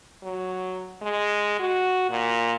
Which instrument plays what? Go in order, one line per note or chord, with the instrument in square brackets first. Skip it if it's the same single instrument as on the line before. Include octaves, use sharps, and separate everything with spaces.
[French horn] F#3
G#3
F#4
A#2